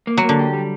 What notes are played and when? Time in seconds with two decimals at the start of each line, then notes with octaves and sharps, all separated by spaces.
0.07 A#3
0.17 F#3
0.23 A#3
0.29 D3
0.39 G4
0.53 G3